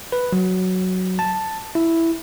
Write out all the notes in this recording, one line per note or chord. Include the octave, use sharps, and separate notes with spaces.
B4
F#3
A5
E4